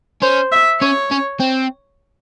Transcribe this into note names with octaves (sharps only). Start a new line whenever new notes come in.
C#4 C5
E5
C#4 C#5
C#4
C4